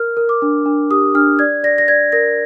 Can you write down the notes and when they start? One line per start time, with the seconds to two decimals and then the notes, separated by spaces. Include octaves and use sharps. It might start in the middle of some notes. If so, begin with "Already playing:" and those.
Already playing: A#4 F6
0.17 A#4
0.29 D6
0.42 D4
0.66 D4
0.90 G4 D#6
1.15 D4 F6
1.39 D5 G#6
1.64 D5 A#6
1.78 A#6
1.88 D5 G#6
2.12 A#4 A#6